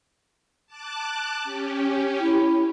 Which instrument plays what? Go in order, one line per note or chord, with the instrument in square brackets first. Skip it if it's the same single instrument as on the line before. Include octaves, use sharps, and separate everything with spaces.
[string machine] A5 D6 F#6
C#4 G4
[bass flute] E4